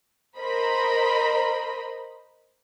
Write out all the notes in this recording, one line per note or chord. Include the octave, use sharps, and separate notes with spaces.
A#4 C5 D#5 B5